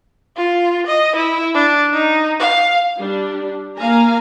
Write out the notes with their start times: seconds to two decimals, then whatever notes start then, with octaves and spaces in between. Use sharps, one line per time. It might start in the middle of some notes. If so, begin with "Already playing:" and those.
0.37 F4
0.87 D#5
1.16 E4
1.54 D4
1.93 D#4
2.40 F5
2.98 G3 D4
3.77 A#3 F5 G#5 A#5